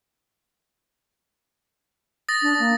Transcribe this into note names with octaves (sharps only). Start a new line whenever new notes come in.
D#6 A6 A#6
D4
A#3